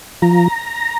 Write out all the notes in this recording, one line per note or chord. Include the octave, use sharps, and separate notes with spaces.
F3 A#5